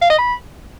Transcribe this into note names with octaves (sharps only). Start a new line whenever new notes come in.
F5
D#5
B5